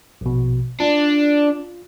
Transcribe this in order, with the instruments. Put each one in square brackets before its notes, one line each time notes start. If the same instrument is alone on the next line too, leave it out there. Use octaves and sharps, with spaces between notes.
[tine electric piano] A#1 B2
[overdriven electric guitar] D4 [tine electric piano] F4